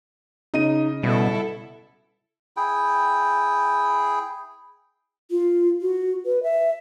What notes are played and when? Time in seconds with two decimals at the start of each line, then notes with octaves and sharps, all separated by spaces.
0.54 C#3 D#4 D#5 D#7
1.03 B2 G3 E4 A4
2.57 E4 G#4 G5
5.31 F4
5.82 F#4
6.26 B4
6.43 E5